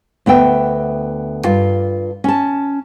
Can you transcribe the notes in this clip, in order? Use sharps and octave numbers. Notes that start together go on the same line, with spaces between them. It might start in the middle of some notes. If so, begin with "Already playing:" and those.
D2 B3 E5 G5
G2 F4
C#4 A5